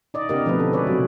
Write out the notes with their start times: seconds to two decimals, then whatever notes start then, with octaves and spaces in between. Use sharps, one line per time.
0.14 D#4 D5 D#5
0.29 C#3 B3 D#4 G4 A#4 D#5
0.45 B2 D3 F3 A3 C4 B4
0.60 A4
0.72 G#3 G#4 B4 C#5 D5
0.87 C3 F#3